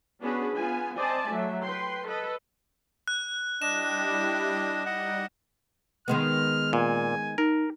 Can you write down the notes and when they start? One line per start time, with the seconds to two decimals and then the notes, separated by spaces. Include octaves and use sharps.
0.21 B3 C#4 D4 F#4 G#4 B4
0.55 B3 F4 G#5
0.97 C4 C5 D5 D#5 G#5 A5
1.26 F#3 A3 E5
1.64 B4 G5 C6
2.06 A4 B4 D#5
3.08 F#6
3.62 G3 D4 E4 G4 D#5 E7
4.86 G3 D#4 D5 D#5 F#5
6.08 D#3 G#3 B3 F6
6.73 A#2 G#5
7.38 D#4 A#4